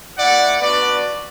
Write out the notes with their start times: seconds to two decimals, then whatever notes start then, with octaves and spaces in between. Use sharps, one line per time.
0.17 A3 E4 D5 F#5
0.60 B3 D4 F#4 B4 D5